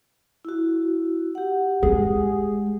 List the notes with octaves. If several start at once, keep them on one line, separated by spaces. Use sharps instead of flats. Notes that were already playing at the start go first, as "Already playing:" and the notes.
E4 F#4
G4 F#5
G#3 G#4